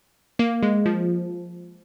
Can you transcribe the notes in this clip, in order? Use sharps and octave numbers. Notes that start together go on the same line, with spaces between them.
A#3
G#3
F3